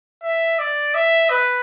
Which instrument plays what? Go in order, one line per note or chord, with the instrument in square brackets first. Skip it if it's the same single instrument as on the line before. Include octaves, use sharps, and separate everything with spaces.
[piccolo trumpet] E5
D5
E5
B4